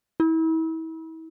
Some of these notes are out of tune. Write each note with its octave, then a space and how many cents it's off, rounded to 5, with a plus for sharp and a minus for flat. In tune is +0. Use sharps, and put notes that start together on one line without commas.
E4 -35